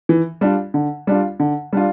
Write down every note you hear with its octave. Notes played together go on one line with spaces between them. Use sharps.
E3
G3 D4 F4
D3
G3 D4 F4
D3
G3 D4 F4